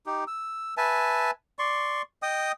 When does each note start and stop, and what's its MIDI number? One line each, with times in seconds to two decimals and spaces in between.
0.06 0.24 63
0.06 0.24 67
0.27 0.74 88
0.77 1.31 71
0.77 1.31 76
0.77 1.31 80
0.77 1.31 81
1.59 2.02 74
1.59 2.02 84
1.59 2.02 85
2.22 2.52 75
2.22 2.52 79
2.22 2.52 87